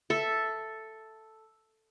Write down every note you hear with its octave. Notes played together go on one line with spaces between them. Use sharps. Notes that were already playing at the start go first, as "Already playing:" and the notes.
A4 E5